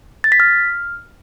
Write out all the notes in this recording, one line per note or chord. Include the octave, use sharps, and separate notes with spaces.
A6
B6
F6